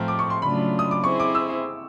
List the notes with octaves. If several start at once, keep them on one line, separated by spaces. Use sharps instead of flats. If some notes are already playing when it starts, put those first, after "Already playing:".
Already playing: A2 F3 A3 C4 A#5
D6
C#6
C6
C#3 F#3 A3 D4 F4 B5
D#6
D6
C4 E4 G#4 C5 C#6
D6
E6